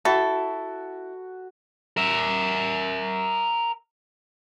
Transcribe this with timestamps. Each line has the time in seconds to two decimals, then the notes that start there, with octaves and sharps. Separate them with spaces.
0.05 E4 F#4 A4
1.97 A#4 E5